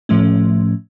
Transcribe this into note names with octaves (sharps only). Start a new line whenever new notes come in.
A2 F3 A3 C#4